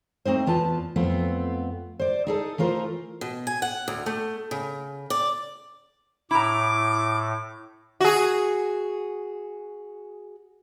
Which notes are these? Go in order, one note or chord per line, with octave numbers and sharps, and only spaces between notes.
A3 C4 D#4 C5
E2 F4 B4 A5
F2 A3 B3 C4 F4
C5 D5
D#4 G#4 A4
E3 A3 F4 A#4 C5
B2
G#5
F#5
D2
A3
C#3
D5
A2 E4 A#5 D6
F#4 G#4